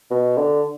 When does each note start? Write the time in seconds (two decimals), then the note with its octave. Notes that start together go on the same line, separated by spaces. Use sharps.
0.10 B2
0.38 D3